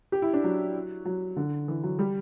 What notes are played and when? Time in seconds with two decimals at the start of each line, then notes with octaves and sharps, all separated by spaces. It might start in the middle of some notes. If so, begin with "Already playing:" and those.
0.12 G4
0.22 E4
0.33 D4
0.44 F#3
1.05 F#3
1.36 D3
1.68 E3
1.83 F#3
1.99 G3